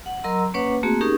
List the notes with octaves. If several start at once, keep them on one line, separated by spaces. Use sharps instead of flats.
F#5
F#3 A#4 D#5 A#5 C6 E6
A#3 C#4 B4 C#5 F#5 D6
A3 A#3 C4 F#4 G#4
C#4 D#4 G4 G#4 A#4